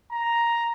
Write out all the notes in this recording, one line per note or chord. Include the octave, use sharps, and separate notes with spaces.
A#5